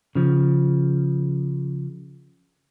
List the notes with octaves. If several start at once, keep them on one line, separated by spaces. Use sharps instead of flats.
C#3 F3